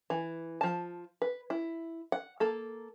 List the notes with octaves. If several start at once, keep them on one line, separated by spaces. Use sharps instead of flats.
E3
F3 A5
B4
E4
F#5
A#3 A4